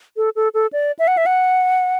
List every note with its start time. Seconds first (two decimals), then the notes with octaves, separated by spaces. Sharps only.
0.17 A4
0.36 A4
0.54 A4
0.73 D5
0.99 E5
1.08 F#5
1.17 E5
1.26 F#5